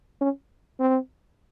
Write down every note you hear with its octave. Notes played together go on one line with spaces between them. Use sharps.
C#4
C4